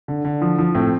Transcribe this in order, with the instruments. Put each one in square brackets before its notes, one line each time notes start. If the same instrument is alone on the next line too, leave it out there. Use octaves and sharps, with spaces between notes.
[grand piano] D3
D3
F3
F3
A2 C4